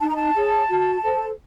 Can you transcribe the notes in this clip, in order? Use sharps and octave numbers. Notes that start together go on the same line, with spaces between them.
D#4 A5
A#5
A5
G#4 C#5
F#4
A4 C5